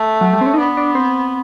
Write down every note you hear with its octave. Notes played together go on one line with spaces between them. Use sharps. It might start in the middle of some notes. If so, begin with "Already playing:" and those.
Already playing: A3
F#3
G3
C4
C#4
D#4
B3 D4
D4
C4